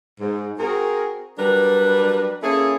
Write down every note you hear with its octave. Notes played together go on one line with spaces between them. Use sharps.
G#2
C4 F#4 G#4 A#4
F#3 G3 D4 A#4 B4
A#3 C#4 E4 G#4 A4 C#5